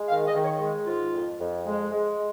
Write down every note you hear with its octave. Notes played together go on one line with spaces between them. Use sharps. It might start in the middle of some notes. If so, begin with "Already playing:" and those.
Already playing: G#3
D#3 F5
D#5
D#3
C#5
G#3
G#2 F4
F2
F2
G#3
G#3